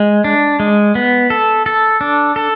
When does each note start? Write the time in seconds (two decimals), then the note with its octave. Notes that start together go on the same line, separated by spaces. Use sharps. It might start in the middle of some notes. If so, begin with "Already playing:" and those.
Already playing: G#3
0.24 D4
0.60 G#3
0.95 B3
1.30 A4
1.66 A4
2.01 D4
2.36 A4